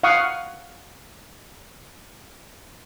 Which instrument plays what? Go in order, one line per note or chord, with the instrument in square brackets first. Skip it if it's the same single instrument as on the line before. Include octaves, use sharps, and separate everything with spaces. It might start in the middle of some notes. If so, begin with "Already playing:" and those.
[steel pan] F5 F#5 C#6 D#6